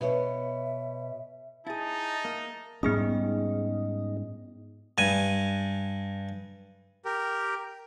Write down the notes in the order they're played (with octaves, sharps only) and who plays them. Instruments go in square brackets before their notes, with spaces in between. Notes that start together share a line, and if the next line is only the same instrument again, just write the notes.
[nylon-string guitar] B2 C#5 [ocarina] E5
[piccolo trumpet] D#4 [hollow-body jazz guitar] E4 G#4 [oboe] A5
[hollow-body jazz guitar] A#3
[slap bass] G#2 G3 C#4 [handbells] B3 G#4 D#6 [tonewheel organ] D#4
[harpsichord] G2 G#5
[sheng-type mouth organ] G4 A#4